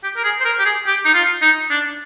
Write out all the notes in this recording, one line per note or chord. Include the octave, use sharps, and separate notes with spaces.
G4
A#4
G#4
C5
A#4
G4
G#4
G4
D#4
F4
D#4
D4